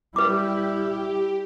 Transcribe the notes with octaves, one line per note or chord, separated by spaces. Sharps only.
G3 E4 G4 B4 D6